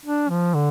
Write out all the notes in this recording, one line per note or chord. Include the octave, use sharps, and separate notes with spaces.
D4
F3
D3